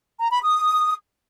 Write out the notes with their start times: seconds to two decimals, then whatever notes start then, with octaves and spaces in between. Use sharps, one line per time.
0.19 A#5
0.31 B5
0.43 D#6